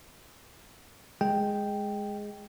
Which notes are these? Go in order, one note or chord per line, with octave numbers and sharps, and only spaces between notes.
G#3 G5